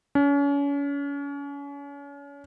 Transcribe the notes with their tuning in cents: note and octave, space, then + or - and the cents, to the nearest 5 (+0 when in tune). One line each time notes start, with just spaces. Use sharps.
C#4 +35